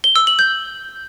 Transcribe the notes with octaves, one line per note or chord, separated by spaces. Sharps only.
G7
E6
F#7
G6